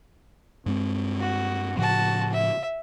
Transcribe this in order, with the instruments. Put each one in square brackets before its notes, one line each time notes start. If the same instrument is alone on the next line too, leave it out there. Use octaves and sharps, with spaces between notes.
[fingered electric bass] G2 G#3 C4
[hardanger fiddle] F#4
[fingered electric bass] A2 C#3 F3 [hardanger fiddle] F#4 A5
[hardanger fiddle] E5